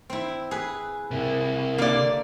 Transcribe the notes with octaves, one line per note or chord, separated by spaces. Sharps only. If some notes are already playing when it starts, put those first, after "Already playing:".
C4 E4
G#4 B4
C3 E4 A#4
D3 A#3 D5 F5